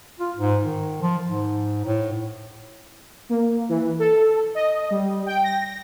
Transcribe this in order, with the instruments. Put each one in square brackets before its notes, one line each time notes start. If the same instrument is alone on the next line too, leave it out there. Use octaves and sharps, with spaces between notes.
[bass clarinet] F4
G#2
D#3
F3
G#2
A2
[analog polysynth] A#3
E3
A4
D#5
G3
G5
A#6